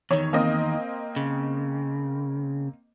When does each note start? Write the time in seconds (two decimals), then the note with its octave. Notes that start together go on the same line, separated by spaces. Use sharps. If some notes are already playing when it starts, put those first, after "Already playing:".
0.11 E2 D#3 C#5
0.33 A#3 C4 D#5
1.16 C#3